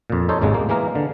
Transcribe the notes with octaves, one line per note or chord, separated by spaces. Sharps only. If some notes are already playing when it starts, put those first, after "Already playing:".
F2 A#2
D#4 A4 C5 C#5
G#1 D#2 G#2 C#3 G#3
A#3
E3 G#3 A#3 A#4
D3